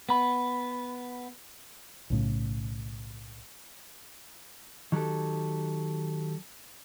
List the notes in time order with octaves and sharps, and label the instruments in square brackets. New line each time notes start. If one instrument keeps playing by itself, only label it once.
[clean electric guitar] B3 B5
[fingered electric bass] B1 A2 C#3
[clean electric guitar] D#3 F#3 G4 A4